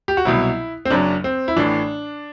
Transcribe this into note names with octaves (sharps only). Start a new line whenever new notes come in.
G4
F#4
C2 B2 F#3 E4
C4
F#1 F#2 F#3 D4
C4
E4
A1 A2 E3 D4